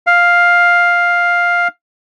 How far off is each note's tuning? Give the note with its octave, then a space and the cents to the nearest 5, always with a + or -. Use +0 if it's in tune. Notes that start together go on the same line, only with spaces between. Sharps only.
F5 +5